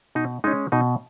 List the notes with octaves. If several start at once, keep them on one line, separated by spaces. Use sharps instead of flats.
B2 D#4
G#3 C#4 D#4
B2 D#4